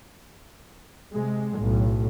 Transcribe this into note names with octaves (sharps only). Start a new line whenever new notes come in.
C3 G#3
B1 A2